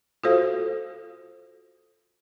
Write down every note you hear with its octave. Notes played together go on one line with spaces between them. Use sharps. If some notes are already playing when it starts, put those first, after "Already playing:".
F4 F#4 A4 C5 F5